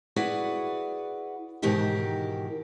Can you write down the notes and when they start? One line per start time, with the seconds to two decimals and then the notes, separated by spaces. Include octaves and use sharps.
0.16 E4 F#4 G#4 B4 D5 F#5
1.62 G#2 B2 D#3 E3 G4 A#4